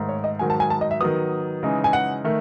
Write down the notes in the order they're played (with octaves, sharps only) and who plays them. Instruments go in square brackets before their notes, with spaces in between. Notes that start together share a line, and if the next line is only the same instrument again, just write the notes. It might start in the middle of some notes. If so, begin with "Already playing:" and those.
Already playing: [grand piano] G#2 D#3 A3
[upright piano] C#5
D#5
[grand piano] G#2 D#3 F#3 [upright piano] G#5
[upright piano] A5
G#5
A5
D#5
E5
[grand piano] D#3 F#3 B3 [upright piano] D#6
[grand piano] C#3 E3 G#3 D#4
[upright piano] G#5
F#5
[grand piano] D#3 A3